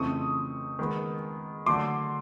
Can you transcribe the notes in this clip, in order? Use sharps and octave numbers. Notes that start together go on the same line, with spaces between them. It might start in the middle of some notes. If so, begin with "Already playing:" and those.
Already playing: F2 C#3 E3 A3 C4 C#6 D#6
D#3 G#3 B3
D3 F#3 A3 C6 D6